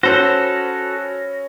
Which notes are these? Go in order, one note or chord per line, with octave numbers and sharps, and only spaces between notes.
C#4 F#4 A4 C5 B5 A#6